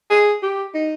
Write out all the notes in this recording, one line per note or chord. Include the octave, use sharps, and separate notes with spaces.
G#4
G4
D#4